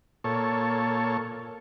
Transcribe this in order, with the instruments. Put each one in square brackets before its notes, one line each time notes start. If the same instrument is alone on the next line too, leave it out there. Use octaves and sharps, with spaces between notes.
[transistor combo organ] A#2 A4 C#5